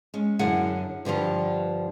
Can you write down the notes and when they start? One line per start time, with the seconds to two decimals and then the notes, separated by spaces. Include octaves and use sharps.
0.14 G#3 C#4
0.39 F#2 D3 E4 G#4 F#5
1.05 G2 D3 F3 G3